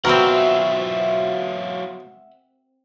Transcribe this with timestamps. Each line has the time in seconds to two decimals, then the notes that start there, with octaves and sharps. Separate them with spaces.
0.05 B2 F#3 C4 F4 A#4 E5 F#5